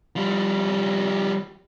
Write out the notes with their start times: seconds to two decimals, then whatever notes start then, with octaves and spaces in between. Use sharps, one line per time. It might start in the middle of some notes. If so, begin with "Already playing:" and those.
0.16 F3 G3